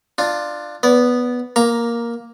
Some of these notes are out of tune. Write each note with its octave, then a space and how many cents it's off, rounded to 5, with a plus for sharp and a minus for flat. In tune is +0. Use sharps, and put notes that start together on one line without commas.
D4 +20 F4 +0
B3 +0 D5 -30
A#3 +10 A#5 +0